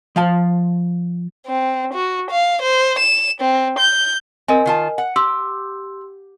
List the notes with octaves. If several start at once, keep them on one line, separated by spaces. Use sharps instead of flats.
F3 F5 A5
C4
F#4
F5
C5
E7
C4
G6
C4 A#4 D#5 G#5
D#3 F4 A5
F#5
G4 C6 E6